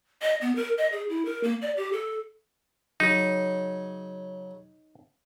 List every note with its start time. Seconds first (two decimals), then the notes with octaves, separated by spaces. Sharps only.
0.22 D#5
0.41 B3
0.56 A#4
0.78 D#5
0.92 G#4
1.09 E4
1.26 A#4
1.44 A#3
1.62 D5
1.77 G4
1.93 A4
3.00 C#3 F#3 D#4